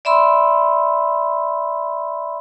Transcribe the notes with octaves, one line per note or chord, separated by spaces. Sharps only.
D5 E5 B5 C6 E6